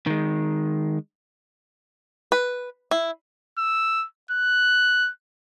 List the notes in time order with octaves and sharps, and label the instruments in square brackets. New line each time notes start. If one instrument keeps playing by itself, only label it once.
[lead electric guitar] D#3 G#3
[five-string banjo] B4
E4
[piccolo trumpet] E6
F#6